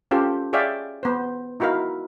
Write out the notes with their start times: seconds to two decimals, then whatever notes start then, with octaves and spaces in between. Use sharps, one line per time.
0.11 C#4 F4 G4 A4 C5
0.53 G#4 C#5 D5 E5 F5 G5
1.03 B3 C5
1.60 D#4 E4 F#4 A#4 F5